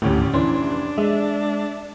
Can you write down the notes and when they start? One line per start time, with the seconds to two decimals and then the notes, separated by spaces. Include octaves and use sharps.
0.02 G#1 D2 A2 C#4 G4
0.34 F1 E3 C#4 D4 C6
0.98 G#3 E5